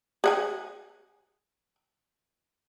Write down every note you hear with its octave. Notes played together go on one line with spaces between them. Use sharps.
G#4 F#5 G#5